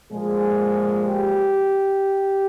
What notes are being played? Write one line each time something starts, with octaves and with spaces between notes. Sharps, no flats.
A#2 F3 G#3 G#4
G4